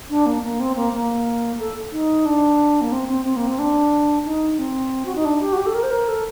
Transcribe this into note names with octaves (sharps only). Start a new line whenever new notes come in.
D4
A#3
A#3
C4
A#3
A#3
A4
D#4
D4
A#3
C4
C4
C4
A#3
C4
D4
D#4
C4
F#4
D#4
D4
G4
F#4
G4
A4
A#4
C5
A#4
A4